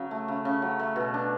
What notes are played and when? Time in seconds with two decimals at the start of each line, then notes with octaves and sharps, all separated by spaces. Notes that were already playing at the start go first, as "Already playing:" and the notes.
Already playing: C#3 F#3
0.11 A3
0.28 C#3
0.45 C#3
0.62 F#3
0.79 A3
0.96 B2
1.14 D4